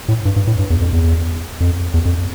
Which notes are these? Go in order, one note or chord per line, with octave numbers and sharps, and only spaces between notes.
A2
G2
G2
A2
G2
E2
F2
E2
F2
E2
F2